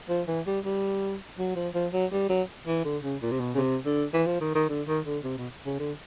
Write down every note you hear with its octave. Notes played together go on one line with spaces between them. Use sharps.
F3
E3
G3
G3
F#3
F3
F3
F#3
G3
F#3
E3
D3
C#3
A#2
C3
B2
C#3
C3
D3
E3
F3
D#3
D#3
D3
D#3
D3
C3
B2
C#3
D3